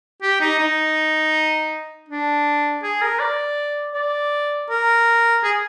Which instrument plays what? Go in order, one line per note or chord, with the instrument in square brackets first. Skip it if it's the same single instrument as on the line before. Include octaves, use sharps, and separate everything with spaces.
[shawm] G4
D#4
D#4
D4
G#4
A#4
D5
D5
A#4
G#4